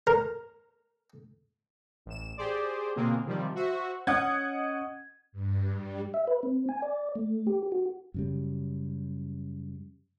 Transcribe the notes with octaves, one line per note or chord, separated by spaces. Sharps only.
A#4
A1 E7
G4 G#4 C5 D5
B2 D3 A#3 C4 F4 G#4
C3 D#3 F3 G3
F#4 C5 E5
C#4 D#5 F#5 D#6 G#6
G2
G3
E5
B4
C4
G#5
D5
A3
G4
F#4
F#2 C#3 G3